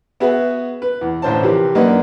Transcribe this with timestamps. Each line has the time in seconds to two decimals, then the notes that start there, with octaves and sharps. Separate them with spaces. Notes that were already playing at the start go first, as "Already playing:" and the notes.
0.20 B3 F#4 G#4 B4 E5
0.82 B4
1.01 E2
1.22 A1 D3 C5 C#5 A5
1.43 C3 E3 F3 G4 A#4 B4
1.75 F#2 A#3 D4 D#4 B4 D#5